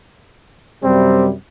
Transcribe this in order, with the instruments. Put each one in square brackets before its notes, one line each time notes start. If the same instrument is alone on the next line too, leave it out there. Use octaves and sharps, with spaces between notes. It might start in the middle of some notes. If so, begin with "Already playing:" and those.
[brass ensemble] F#2 C3 G3 [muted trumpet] C4